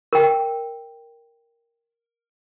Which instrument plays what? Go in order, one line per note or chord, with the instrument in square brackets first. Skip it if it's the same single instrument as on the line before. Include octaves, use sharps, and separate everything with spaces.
[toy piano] A#4 G5